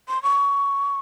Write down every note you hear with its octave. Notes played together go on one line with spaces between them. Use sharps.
C6
C#6